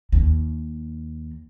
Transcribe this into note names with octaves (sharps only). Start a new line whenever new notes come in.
D#2